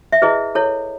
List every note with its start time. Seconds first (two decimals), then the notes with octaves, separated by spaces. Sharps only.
0.12 E5
0.22 E4 G#4 B4 D#5
0.55 E4 A4 C#5